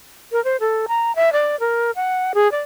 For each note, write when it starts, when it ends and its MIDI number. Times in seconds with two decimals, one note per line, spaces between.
0.32 0.43 70
0.44 0.57 72
0.60 0.86 69
0.88 1.14 82
1.16 1.32 76
1.33 1.59 74
1.60 1.91 70
1.96 2.32 78
2.34 2.50 68
2.52 2.60 74